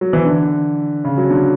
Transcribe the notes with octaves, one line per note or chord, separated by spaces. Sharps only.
F#3
E3
D3
C#3
F#3
D3